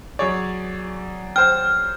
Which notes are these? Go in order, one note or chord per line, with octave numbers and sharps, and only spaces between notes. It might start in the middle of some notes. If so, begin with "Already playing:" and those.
F#3 G#4 C#5 D5
C5 G5 F6